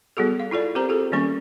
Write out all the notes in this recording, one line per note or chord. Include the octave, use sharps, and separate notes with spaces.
G3 B3 F#4 G#4 A4
F5
E4 F4 A4 D5
C4 G4 A#4 C5 A#5
F4 G#4 A4
D#3 G3 A#3 C#4 C#6